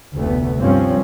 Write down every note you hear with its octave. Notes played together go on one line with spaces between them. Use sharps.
F1 D2 A3 B3
G2 F3 C4 C#4